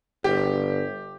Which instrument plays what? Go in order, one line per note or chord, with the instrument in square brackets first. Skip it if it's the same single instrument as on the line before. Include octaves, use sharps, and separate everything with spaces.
[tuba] G1 [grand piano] G4